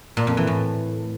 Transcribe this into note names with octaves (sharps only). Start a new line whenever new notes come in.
A#2
F2
E3
A2